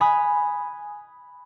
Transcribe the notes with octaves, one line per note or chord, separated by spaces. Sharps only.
G#5 A#5 B5 D#6 F#6